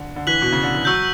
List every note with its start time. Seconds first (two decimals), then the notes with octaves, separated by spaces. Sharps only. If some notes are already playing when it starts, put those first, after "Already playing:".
Already playing: D3
0.16 D3
0.27 E3 F#6 B6 F#7
0.42 B2
0.52 C#3
0.63 D3
0.75 E3
0.85 F#3 C#6 E6 G6